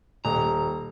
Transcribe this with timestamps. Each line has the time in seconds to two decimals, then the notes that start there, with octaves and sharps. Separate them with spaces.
0.25 D#1 A#5